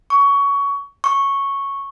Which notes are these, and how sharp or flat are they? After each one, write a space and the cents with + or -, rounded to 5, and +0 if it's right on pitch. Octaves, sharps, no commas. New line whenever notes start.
C#6 +20
C#6 -5